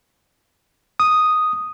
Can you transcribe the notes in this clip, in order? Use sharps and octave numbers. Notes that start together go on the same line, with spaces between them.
D#6